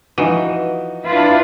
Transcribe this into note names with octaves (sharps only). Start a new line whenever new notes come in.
E3 F3 D#4 F#4
D4 E4 F4 B4